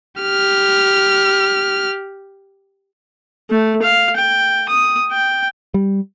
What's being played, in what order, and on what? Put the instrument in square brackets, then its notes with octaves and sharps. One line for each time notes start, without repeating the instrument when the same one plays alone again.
[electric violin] G4 F6
[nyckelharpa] A3
F5
G5
D#6
G5
[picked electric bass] G3